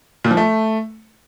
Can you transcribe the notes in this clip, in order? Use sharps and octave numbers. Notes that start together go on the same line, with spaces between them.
A#2
F3
A3